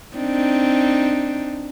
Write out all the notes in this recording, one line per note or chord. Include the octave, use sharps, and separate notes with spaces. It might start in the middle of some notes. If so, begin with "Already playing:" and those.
C4 D4 D#4